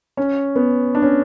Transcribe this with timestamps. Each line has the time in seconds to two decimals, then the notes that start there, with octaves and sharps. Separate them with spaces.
0.17 C#4
0.56 B3
0.95 D4
1.02 C#4